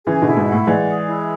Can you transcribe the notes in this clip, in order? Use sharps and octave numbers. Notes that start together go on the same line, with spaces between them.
C#3 E3 G#4
B2 D3 E4
G#2 B2
F#5
A2
E3 G#3 D5
G#4
E4